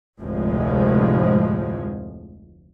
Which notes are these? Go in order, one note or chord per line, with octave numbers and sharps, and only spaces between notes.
F1 D2 A2 F3 G#3